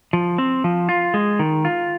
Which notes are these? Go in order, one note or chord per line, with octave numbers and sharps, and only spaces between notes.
F3
C4
F3
F4
G#3
D#3
F4